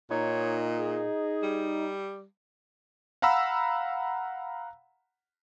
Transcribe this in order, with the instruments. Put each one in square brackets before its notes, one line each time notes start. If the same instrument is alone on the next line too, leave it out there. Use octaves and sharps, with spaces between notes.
[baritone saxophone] A#2 [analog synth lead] D#4 [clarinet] C#5
[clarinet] G#4
[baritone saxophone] G3
[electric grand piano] F5 F#5 A#5 B5 E6